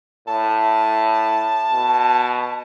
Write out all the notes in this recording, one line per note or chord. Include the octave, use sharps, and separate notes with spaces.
A2 A5
B2